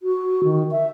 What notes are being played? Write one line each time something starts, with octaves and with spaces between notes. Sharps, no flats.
F#4
D#3
E5